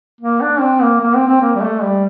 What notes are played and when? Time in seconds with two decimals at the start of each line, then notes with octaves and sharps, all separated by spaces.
0.21 A#3
0.41 D4
0.60 C4
0.82 A#3
1.01 A#3
1.15 C4
1.28 C4
1.42 A#3
1.55 G3
1.62 A3
1.82 G3